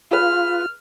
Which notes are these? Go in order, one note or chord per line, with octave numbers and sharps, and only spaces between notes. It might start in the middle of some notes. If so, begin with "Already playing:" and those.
F4 G#4 B4 F6